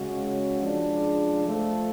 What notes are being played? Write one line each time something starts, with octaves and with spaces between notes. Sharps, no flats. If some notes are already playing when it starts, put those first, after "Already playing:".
Already playing: C#3 G#3 C#4 F#4
C#3 F3 G#3 D4
F3 A3 F4 A4